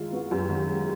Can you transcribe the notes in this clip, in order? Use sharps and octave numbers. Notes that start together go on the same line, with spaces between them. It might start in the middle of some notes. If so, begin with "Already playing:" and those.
Already playing: D#3 G#3 E4 F4
B3 F#4
F#2 G4
D#3
G#3